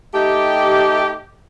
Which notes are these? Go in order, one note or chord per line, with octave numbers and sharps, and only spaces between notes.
A3 D#4 G4